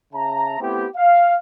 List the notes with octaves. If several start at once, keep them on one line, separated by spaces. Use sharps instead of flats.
C#3 E5 A5 A#5
A3 B3 C4 E4 G4
F5